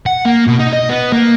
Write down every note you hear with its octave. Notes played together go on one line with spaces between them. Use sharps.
F#5
A#3
B2
D#4
D#5
B3
A#3